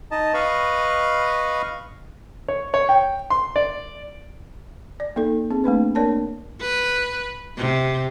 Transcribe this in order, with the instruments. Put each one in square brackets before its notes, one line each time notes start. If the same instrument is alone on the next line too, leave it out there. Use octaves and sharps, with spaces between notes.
[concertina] D#4 D#5 A5
B4 D#5 F5 B5 C#6
[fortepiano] C#5
C#5
G5
C6
D5
[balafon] D5
A#3 D#4 A4
C4 G#4
A3 A#3 D4 B4
A#3 D4 A#4 C#5 D5 A5
[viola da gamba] B4
C3